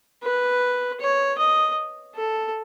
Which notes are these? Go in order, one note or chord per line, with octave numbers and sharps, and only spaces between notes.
B4
C#5
D#5
A4